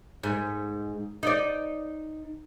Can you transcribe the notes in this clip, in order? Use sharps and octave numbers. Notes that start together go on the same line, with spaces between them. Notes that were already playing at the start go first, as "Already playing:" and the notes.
G#2
D#4 D5